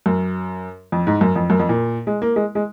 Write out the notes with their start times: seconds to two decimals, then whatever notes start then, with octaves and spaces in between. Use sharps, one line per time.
0.06 F#2
0.92 F2
1.07 G#2
1.21 F#2
1.36 F2
1.50 F#2
1.59 F2
1.69 A#2
2.07 G#3
2.22 A#3
2.36 G#3
2.55 G#3